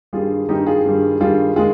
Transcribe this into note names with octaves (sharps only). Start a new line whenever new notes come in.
G2 D#3 G3 F4 G#4
G2 D#3 G3 D#4 G4
F4 G#4
G2 D#3 G3
G2 D#3 G3 F4 G#4
D#3 G#3 F4 G#4